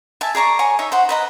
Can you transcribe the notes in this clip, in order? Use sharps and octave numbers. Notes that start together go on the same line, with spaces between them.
E5 G#5 A5
G#4 D5 A#5 C#6
C#5 G#5 A#5 C#6
D#4 C#5 E5
C5 F#5
B4 D#5 A#5